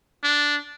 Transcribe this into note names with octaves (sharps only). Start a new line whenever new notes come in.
D4